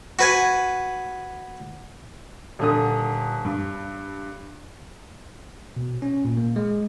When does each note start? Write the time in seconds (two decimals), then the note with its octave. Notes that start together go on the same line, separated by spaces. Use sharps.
0.19 F#4 B4 G#5
2.59 D#1 D3 D#6
3.45 G2
5.76 B2
6.02 C#4
6.25 A#2
6.37 A#3
6.56 G#3